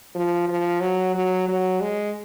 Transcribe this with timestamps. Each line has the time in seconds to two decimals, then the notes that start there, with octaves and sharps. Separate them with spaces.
0.15 F3
0.48 F3
0.82 F#3
1.15 F#3
1.49 F#3
1.82 G#3